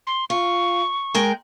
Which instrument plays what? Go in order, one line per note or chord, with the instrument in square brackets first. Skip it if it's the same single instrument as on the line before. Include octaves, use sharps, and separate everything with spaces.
[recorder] C6
[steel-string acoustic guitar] F4 [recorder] C#6
[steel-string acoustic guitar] G#3 A#4 G5